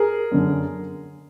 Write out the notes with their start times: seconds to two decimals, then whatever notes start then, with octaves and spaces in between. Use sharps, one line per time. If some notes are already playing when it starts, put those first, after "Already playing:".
Already playing: G#4 A#4
0.31 F#2 D3